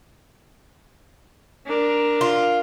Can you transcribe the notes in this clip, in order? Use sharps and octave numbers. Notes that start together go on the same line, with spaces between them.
D4 A#4
F4